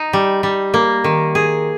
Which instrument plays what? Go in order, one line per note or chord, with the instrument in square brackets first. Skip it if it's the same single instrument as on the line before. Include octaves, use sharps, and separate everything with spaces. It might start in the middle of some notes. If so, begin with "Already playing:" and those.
Already playing: [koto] D#4
G3
G3
A#3
D#3
G#4